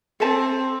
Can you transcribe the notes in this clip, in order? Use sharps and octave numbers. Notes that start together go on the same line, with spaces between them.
C4 A4 E5 A5